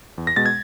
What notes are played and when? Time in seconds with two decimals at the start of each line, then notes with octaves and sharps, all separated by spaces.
0.18 E2
0.27 A#6
0.36 B2 G#3 A6
0.46 G#6